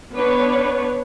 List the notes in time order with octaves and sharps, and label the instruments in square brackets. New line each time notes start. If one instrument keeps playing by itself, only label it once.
[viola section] B3 D4 B4 C#5